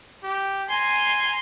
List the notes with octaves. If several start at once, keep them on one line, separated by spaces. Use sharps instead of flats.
G4
G#5 A#5 C6